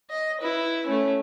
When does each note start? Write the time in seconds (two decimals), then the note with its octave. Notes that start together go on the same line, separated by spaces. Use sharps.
0.10 D#5
0.41 E4 B4
0.87 A3 C#4